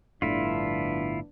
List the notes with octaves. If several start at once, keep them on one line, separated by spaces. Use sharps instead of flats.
G1 A2 D3 F3 B3 D4 E4 F4